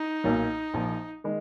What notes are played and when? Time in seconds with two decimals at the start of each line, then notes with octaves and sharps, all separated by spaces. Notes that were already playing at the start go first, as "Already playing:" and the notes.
Already playing: D#4
0.24 B1 A#2 F#3 A#3
0.74 A#1 A#2 F3
1.24 D#3 G#3